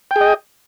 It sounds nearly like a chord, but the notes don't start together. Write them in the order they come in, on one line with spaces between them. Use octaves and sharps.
G5 G#4 D#5